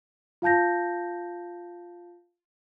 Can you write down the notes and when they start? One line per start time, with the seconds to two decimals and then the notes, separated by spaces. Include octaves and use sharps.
0.42 F4 F5 A5 G6 A#6